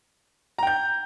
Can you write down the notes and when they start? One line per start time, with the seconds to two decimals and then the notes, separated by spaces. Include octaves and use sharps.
0.58 A#5
0.63 G5
0.67 G6